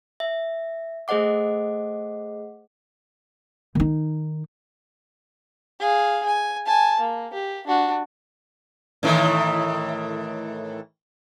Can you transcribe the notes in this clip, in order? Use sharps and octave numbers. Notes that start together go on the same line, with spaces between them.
E5
A3 G#4 C5 D#5 F#5 D6
D#3 D#4
G#4 F5
G#5
G#5 A5
A#3
G4
D4 F#4
A2 D#3 E3